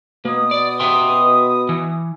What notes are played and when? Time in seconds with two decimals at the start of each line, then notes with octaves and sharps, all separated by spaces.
0.25 B2 A#3 D#6
0.51 D5
0.80 E5 G5 C6
1.69 E3